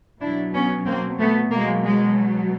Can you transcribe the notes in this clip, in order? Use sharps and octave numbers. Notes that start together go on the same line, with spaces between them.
B2 F#3 D4 E4
B3 C#4
A#3 C4
A3 B3
B2 F#3 G#3 A#3
G#3